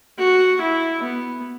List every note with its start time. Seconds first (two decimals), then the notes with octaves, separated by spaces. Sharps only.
0.18 F#4
0.61 E4
1.03 B3